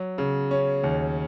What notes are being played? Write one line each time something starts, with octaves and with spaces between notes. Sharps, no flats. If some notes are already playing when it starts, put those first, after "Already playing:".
Already playing: F#3
C#3
C#4
D#2